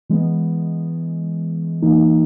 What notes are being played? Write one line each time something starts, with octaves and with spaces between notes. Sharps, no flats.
E3 G#3 B3
E3 A#3 D#4